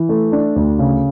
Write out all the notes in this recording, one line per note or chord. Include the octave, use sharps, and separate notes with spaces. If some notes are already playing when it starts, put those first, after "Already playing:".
Already playing: E3
A3
D4
D2
C#3